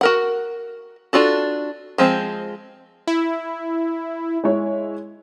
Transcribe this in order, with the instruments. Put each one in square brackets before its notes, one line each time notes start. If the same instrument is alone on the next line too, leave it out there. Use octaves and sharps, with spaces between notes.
[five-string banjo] F#4 A#4 F#5
D4 F4 F#4 A4
F3 G#3 C4
[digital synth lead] E4
[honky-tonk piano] G#3 E4 C#5